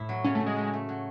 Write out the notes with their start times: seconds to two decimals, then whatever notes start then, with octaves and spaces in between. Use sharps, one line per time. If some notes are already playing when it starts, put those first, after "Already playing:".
Already playing: A2 E4
0.09 F#3
0.24 C#3 C#4
0.35 A3
0.40 C#3
0.46 G#3
0.56 A3
0.73 A3
0.89 F#3